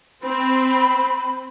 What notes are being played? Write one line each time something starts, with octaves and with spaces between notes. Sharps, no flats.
C4 B5